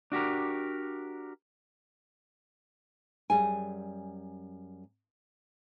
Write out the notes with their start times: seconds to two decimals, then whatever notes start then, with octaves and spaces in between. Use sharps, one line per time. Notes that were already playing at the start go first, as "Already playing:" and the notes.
0.12 D4 F#4 G4 A#4
3.30 F#2 G3 G#4 G#5